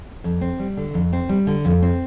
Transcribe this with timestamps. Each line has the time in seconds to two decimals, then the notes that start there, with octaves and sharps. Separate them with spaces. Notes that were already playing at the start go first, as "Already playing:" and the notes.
0.24 F2
0.41 C4
0.59 G3
0.77 D3
0.94 F2
1.13 C4
1.29 G3
1.47 D3
1.65 F2
1.82 C4